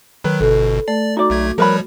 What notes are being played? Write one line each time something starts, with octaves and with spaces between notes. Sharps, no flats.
D#3 F#3 B4
G1 B2 A4
A3 D5
D#4 F#4 D5 D6
B1 A3 G#6
F3 G3 A#4 B4 C#5 B5